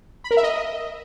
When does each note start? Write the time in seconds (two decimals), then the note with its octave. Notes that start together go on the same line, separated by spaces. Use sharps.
0.24 B5
0.31 A#4
0.37 E5
0.43 D#5